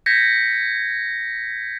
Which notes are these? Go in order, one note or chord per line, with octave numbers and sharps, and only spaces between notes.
G6 G#6 A#6 B6 C#7